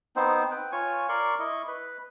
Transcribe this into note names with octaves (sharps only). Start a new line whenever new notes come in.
B3 C4 D#4 C5
B4 G5
F4 C#5 G#5 C#6
A#4 D5 C6 C#6
E4 D#5 C#6
B4 B5